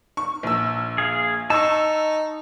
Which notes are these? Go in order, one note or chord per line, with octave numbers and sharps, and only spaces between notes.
C#6
A#1 E6
G#4 F5
D#4 A5 C#6 E6